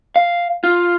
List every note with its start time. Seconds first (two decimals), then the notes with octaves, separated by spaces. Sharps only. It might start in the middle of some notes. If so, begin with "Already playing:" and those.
0.16 F5
0.64 F4